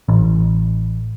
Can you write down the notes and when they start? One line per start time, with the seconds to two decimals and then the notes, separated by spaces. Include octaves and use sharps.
0.09 A1